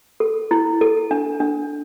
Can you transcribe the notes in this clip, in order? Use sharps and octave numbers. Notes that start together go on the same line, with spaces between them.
A4
E4
A4
D4
D4